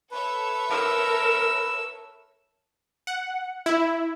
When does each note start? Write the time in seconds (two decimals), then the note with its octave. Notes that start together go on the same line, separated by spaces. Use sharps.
0.11 A4 B4 C#5 E5
0.71 A#4 E6
3.07 F#5
3.66 E4